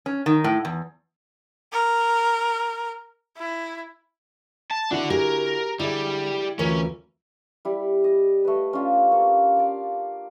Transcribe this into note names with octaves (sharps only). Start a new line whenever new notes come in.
C#4
D#3
A2
E2
A#4
E4
A5
D3 D4 E4 F#4 F#5
G4 G#4 A#4
D3 G3 E4 G#4
D2 E3 C#4 F4 A#4
G3 E4
D#5
A3 B4
C#4 D4 F4 G4
A#3 A4
D5 F5